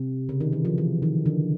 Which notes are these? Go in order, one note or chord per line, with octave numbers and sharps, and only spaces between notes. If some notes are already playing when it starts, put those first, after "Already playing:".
Already playing: C3
C#3
D#3
E3
F3
E3
D#3
D3